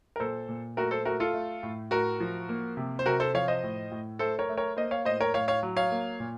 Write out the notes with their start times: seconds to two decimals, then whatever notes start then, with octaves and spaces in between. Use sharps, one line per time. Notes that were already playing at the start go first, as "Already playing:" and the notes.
0.16 A#4
0.20 A#2 A4 C5
0.49 A#2
0.77 A3 F#4 A#4
0.91 A4 C5
1.05 A3 F#4 A#4
1.20 F4 A4
1.34 A3
1.63 A2
1.91 A2 F#4 A#4
2.20 F3
2.49 A#3
2.77 C3
2.99 C5
3.06 C3 F#4 A#4
3.20 A4 C5
3.34 F3 C#5 F5
3.48 C5 D#5
3.63 A2
3.91 A2
4.19 A3 A4 C5
4.39 A#4 C#5
4.49 A3
4.57 A#4 C#5
4.77 A#3 C5 D#5
4.91 C#5 F5
5.05 A2 C5 D#5
5.21 A#4 C#5
5.34 A2 C#5 F5
5.48 C#5 F5
5.63 F#3
5.77 C#5 F5
5.91 A#3
6.20 A#2